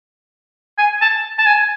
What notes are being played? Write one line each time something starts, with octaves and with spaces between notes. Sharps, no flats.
G#5
A5
A5
G#5